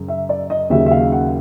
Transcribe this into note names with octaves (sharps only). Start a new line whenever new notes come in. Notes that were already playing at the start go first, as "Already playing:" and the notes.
Already playing: F#2 C#3
E5
D5
D#5
D#2 C#3 F#3 E5
E5
F5
F#5